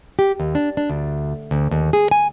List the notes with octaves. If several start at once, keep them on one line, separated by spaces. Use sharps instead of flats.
G4
D#2
D4
D4
D2
D2
D#2
G#4
G#5